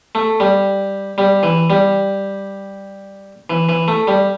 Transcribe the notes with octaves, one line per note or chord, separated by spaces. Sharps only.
A3
G3
G3
E3
G3
E3
E3
A3
G3